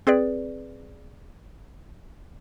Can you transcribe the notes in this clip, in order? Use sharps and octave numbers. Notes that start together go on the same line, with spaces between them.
C4 G#4 B4 D5